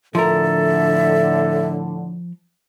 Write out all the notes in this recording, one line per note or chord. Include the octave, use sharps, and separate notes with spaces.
A2 D3 F3 A4 A#4 E5